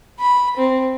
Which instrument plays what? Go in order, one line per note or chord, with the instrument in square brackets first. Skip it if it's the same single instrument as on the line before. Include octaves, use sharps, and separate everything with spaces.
[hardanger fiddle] B5
C4